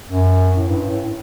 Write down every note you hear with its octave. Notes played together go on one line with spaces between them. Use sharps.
F#2
A2
G2
A2